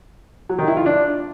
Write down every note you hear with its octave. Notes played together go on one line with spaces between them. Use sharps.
F#3
D#3
E4
F4
D4